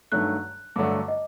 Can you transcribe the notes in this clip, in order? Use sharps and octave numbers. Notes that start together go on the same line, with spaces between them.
G2 D#3 F#3 A3 F#6
G2 D3 F#3 A3 D4 D6
D#5